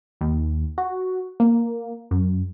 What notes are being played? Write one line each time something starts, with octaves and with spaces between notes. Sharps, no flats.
D#2
F#4
A#3
F#2